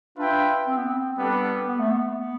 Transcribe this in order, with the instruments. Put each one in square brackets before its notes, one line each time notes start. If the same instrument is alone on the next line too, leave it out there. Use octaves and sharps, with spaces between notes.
[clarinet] D4 [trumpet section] F4 B4 E5 G5
[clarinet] C4
B3
C4
[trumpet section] G3 B3 D4 A4
[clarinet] B3
A3
B3
B3